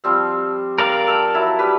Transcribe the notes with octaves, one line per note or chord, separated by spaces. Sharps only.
F3 G3 C4
A#4 D5 F5 G5
A4 G5
F#3 E4 A5
G3 G4 B4